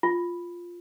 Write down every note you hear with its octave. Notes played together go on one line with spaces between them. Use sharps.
F4